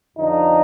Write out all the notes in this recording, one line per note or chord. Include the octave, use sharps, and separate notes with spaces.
F2 D3 F3 D#4